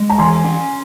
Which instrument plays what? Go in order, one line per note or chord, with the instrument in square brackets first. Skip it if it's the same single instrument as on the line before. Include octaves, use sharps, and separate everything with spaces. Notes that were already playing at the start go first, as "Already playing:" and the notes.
Already playing: [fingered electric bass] G#3
[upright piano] A#5
[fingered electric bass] E3 [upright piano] G#5 C6
[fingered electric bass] C#4